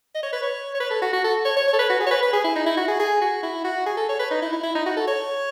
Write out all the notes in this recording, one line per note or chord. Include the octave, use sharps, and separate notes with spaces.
D#5
C#5
B4
C#5
C#5
B4
A4
F#4
F#4
A4
C#5
C#5
C#5
A4
B4
F#4
G#4
C#5
B4
B4
G#4
E4
D#4
E4
F#4
G#4
G#4
F#4
E4
F#4
G#4
A4
C#5
B4
D#4
E4
E4
E4
D#4
F#4
A4
C#5